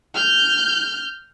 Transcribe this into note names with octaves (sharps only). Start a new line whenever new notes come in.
F6 G6